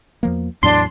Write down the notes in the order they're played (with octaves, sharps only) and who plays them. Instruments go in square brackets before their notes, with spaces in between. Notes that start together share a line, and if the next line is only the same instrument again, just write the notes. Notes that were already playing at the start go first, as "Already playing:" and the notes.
[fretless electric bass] E2 F3 A#3
[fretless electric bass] E2 A2 F#3 [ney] D4 [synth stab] C6